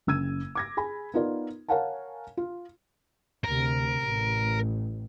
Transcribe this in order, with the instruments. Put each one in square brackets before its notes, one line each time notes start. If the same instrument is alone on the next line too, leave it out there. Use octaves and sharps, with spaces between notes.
[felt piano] F#1 C#3 E6 G#6 D#7
D6 G#6 A#6
G#4 G#5 B5
B3 D#4 F4 A#4 D5
A#4 C#5 F5 F#5 G#5 A5
F4
[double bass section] D2 C3 [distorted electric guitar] A#4
[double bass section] A1